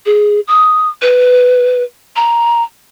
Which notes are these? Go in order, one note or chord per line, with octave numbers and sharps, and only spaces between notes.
G#4
D#6
B4
A#5